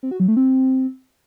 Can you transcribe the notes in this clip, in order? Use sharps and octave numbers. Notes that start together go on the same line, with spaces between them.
C4
F#4
F#3
A3
C4